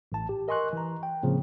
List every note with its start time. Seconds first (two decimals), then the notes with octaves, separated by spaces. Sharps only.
0.12 A1 A5
0.29 G4
0.48 A#4 D#5 G#5 C6 C#6 F#6
0.73 E3 A#5
1.03 G5
1.23 A2 C#3 F3 A#3 C4